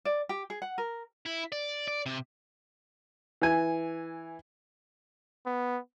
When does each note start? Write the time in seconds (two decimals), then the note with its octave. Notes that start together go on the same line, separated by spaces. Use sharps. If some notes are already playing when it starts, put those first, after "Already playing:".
0.05 D5
0.29 G4
0.50 G#4
0.62 F#5
0.78 A#4
1.26 E4
1.52 D5
1.88 D5
2.06 C3
3.42 E3 G#5
5.46 B3